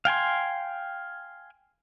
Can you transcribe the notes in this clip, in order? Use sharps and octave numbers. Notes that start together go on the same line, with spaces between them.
F5 G5 G#5 C6